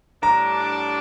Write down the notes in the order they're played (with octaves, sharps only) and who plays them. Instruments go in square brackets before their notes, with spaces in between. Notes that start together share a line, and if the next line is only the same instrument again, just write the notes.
[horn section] A2 G3 D4 [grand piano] A#5